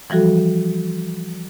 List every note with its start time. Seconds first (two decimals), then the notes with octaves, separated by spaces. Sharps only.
0.10 E3 F3 G3 F#4 A4